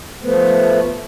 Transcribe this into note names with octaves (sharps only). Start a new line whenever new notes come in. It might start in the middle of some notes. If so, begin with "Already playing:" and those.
F3 A3 B3